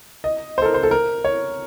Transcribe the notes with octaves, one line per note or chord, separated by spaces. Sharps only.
D#5
C5
A4
A#4
C5
A4
A#4
C#5